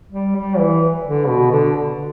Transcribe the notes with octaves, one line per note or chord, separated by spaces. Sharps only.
G3
G3
E3
D3
B2
D3